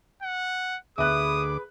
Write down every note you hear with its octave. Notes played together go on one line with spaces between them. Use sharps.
F#5
D2 G#4 B4 E5 D6 D#6 F#6